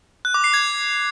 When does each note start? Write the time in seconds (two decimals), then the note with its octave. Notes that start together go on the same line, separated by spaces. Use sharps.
0.25 F#6
0.34 D6
0.44 C7
0.54 G#6